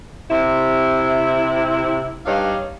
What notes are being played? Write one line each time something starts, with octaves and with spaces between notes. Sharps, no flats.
C3 E4
G2 G3 D4 D#4 C#5 F5